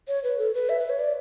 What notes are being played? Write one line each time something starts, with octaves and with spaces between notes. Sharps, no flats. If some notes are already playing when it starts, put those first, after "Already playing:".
C#5
B4
A4
B4
E5
B4
C#5
D5